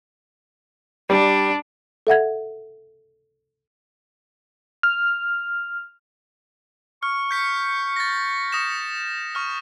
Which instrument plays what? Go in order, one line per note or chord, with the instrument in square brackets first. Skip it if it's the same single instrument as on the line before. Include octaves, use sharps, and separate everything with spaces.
[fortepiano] G3 [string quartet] D4
[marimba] A4 E5 F#5 G#6
[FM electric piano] F6
[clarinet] C#6 [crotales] F6
[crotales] G6 B6 C#7
A6 A#6
D#6 A#6 E7
C#6 F6